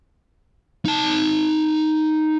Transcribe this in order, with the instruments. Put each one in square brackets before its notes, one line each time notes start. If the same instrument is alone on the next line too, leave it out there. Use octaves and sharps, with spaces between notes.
[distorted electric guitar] D#4 A5